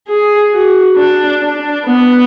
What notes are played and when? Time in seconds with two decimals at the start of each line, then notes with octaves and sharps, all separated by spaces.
0.08 G#4
0.52 F#4
0.97 D4
1.41 D4
1.85 B3